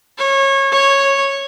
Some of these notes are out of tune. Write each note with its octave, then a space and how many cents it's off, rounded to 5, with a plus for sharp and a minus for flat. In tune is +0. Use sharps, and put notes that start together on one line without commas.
C#5 -25
C#5 -10